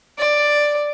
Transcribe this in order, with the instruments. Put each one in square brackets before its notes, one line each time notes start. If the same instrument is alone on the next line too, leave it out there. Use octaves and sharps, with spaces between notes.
[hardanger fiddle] D5